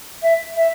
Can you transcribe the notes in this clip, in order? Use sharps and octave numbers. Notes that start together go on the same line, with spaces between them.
E5
E5